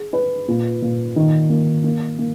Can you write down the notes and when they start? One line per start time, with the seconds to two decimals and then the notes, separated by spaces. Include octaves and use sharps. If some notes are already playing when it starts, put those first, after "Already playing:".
Already playing: G#4
0.13 B4
0.48 A#2
0.82 A#2
1.16 D#3
1.50 A#3
1.84 A#3
2.19 A#3